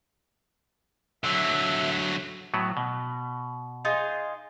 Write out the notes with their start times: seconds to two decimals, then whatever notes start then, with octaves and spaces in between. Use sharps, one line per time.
1.24 D3 F#3 E5
2.54 A2 F#3 B3
2.77 B2
3.85 D#4 F4 G#4